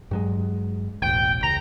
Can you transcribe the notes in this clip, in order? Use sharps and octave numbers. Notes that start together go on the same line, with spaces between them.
G2 F#3 G#3
E1 A1 G5
C#2 A#5